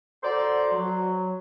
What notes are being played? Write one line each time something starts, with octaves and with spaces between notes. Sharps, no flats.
F#4 A4 C5 D5 F#5 A#5
F#3